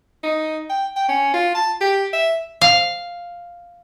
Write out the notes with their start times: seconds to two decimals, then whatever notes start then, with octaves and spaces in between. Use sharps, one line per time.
0.23 D#4
0.70 G5
0.96 G5
1.08 C#4
1.34 F4
1.55 A5
1.81 G4
2.13 E5
2.61 F5